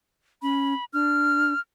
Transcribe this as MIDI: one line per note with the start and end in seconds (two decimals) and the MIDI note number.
0.42 0.74 61
0.42 0.85 83
0.93 1.53 62
0.93 1.60 89